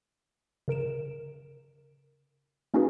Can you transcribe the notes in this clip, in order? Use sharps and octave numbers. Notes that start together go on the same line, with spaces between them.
C#3 A#4 D7 E7
A#3 C#4 D#4 F#4 G#4 B4